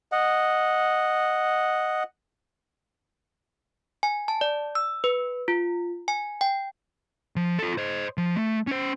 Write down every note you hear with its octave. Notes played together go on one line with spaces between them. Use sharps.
D#5 F#5
G#5
A5
D5
E6
B4
F4
G#5
G5
F3
F4 A4
C5 D#5
F3
A3
C#4 C5